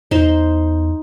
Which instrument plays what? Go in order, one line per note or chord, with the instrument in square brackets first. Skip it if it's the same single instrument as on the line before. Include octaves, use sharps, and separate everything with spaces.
[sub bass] E2 [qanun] D#4 C5